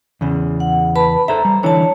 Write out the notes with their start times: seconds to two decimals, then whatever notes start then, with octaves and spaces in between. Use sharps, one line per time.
0.21 E2 C#3
0.60 F#5
0.95 B4 A5 B5
1.28 A4 C5 E5 A#5
1.45 G3
1.63 D3 E3 E4 C#5 A5